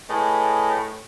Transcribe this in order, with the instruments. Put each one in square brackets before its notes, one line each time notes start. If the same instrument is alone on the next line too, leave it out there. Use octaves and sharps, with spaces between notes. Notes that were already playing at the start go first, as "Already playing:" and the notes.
[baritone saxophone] A2 [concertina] G#4 B4 D#5